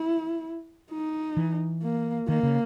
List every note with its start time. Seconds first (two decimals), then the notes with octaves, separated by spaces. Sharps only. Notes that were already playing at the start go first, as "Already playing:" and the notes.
Already playing: E4
0.91 D#4
1.37 E3
1.83 A#3
2.28 D#3 A#3
2.43 C#3